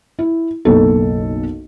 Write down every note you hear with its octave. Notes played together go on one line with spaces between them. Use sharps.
E4
F#1 B1 A4